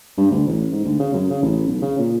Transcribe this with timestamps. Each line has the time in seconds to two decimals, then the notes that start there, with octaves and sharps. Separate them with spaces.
0.17 G2
0.31 D2
0.47 A1
0.72 G#2
0.84 D2
0.99 C#3
1.13 F#2
1.30 C#3
1.42 A1
1.67 B1
1.82 C#3
1.98 A#2